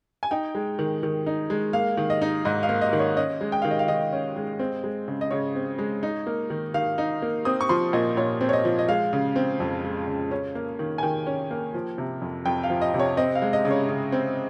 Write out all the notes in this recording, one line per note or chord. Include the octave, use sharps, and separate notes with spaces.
G#5
D#4 G5
G#3
D#3
D#3
D#4
G#3
A#3 F5
D#3
D#5
D#4
G#2 D#5
F5
A#3
D#5
D#3
C#5
C#4 D#5
G#3
G5
D#3 F5
D#5
F5
D#3 D#5
C#4
G#3
C4
G#3
C#3
D#5
C#3 C#5
C4
G#3
D#4
A#3
D#3
D#3 F5
D#4
A#3
C4 D#6
C#6
F3 C6
A#2 D#5
A#2 C#5
C4
C#5
D#5
F3
D#5
G#3 F5
C#3
C4
F2
G#3
C#3
C#4
A#3
D#3
G#5
D#3 G5
C#4
A#3
F3
C3
F2
F2 G5
F5
F3
D#5
C3
C#5
C4 D#5
F5
G#3
D#5
C#3
C#5
C#3
C4